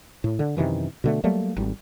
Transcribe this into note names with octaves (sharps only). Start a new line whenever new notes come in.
A2
D3
F#2 C3 D#3 E3
B2 D3 A3
F#3 G3 A3 A#3
G#1 G3